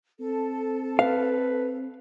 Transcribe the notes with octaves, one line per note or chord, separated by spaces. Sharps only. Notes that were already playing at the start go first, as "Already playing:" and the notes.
C4 A4
B4 F5